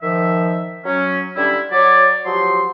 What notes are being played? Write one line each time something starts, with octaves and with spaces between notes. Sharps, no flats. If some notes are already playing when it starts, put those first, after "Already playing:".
D#3 F3 E5
F#3 C#4
D3 G3 C#4 D4 E4
F#3 C#5 D5
F3 F#3 G4 C6